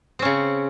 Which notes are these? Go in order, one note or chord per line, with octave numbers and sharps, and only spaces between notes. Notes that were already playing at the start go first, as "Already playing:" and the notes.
C#3 C4 C#4